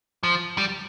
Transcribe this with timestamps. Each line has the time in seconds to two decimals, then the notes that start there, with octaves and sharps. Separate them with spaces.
0.23 F3
0.58 G3